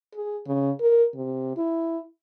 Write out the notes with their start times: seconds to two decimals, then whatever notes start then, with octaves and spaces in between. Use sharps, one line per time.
0.15 G#4
0.46 C#3
0.81 A#4
1.15 C3
1.57 E4